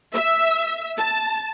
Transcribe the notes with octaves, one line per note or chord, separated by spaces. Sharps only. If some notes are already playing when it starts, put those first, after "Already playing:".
E5
A5